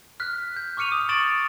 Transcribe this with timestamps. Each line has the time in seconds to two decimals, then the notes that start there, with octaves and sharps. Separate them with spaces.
0.20 F6 F#6 B6
0.57 G6
0.77 C#6 D6 F6 C#7 D#7 F7
0.92 D#6
1.09 C#6 D#6 A6 D7 E7 F#7